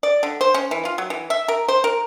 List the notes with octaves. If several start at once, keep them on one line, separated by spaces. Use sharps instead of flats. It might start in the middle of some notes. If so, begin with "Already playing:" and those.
D5
D3
C5
C#4
E3
F4
F#3
E3
E5
A#4
C5
A#4